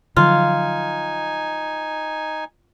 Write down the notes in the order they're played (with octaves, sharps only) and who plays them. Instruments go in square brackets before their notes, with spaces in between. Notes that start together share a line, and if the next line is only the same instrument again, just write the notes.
[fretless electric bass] D3 F3 F#3 [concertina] D#4 G#5 [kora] F4